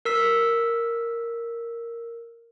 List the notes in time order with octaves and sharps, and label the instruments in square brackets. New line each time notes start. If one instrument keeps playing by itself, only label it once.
[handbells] A#4 E6 B6